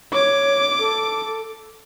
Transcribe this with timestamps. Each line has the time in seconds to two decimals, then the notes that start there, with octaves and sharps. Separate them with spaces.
0.13 C#5 D6
0.79 A4